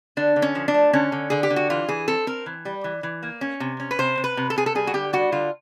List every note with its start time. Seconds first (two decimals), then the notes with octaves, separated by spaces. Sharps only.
0.17 D3 D4
0.36 D3
0.42 C#4
0.55 F3
0.68 D4
0.74 A3
0.93 D3 C#4
1.12 D3
1.30 D3 G#4
1.43 G4
1.50 D3
1.56 F#4
1.70 E3 F4
1.89 E3 G#4
2.08 C4 A4
2.27 C4 A#4
2.46 E3
2.65 G3
2.84 E3
3.03 E3
3.23 A#3
3.41 C#4
3.60 C3
3.80 C#4
3.91 B4
3.99 C3 C5
4.17 C3
4.24 B4
4.37 C3
4.50 A4
4.56 C3 G#4
4.66 A4
4.75 G3 G#4
4.87 F#4
4.94 D3 G4
5.13 G3 F#4
5.32 D3 F4